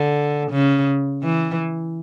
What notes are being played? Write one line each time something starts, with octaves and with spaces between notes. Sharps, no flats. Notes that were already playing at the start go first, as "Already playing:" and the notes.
Already playing: D3
C#3
E3